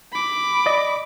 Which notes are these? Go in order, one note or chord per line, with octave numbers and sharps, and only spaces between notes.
B5 D6
D5 D#5